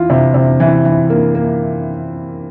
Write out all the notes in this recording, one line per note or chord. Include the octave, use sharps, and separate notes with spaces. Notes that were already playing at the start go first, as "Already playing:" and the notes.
Already playing: E3 F4
C3
C3
E3
E3
A#3
A#3